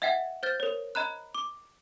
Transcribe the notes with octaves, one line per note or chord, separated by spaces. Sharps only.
D#5 E5 F#5 G5 G#6
C5 F6 G6 A6
A#4 C#5
D#5 A#5 B5 F#6
D6